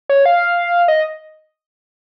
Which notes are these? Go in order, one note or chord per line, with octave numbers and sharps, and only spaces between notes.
C#5
F5
D#5